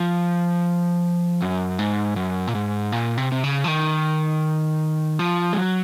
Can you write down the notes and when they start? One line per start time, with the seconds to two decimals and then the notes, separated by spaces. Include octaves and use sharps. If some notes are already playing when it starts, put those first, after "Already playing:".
Already playing: F3
1.42 F#2
1.79 G#2
2.16 F#2
2.47 A#2
2.55 G#2
2.92 A#2
3.17 C3
3.32 C3
3.44 C#3
3.64 F3
3.68 D#3
5.19 F3
5.53 G#3
5.58 F#3